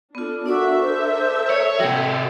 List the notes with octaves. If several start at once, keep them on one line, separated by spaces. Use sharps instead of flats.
B3 D4 F4 A4
D4 F#4 A4 A#4 D5 E5 D6
C5
C#5 D5
C3 F#4 G5